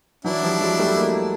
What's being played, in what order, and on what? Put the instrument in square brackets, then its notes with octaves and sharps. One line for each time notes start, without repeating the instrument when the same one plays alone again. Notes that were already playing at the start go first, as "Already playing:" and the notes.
[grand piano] E3 F#3 [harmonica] D4 E4
[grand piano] F3 G3
F#3 G#3
G3 A3
G#3 A#3